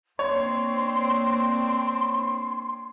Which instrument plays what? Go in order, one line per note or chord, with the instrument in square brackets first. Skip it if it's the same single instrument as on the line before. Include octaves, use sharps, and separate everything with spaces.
[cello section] A#3 C4 D4 [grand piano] C#5 [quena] C6